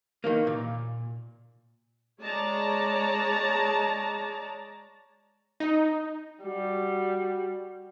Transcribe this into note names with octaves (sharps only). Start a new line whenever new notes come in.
D#3 E3 A#3
A#2
G#3 C#5 D5 A5 A#5
D#4
G3 F#4